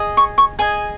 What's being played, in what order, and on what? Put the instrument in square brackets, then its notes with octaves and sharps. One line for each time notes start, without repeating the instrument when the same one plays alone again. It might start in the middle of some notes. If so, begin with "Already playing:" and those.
Already playing: [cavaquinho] G#4 D#5
C#6
C#6
G#4 D#5 G#5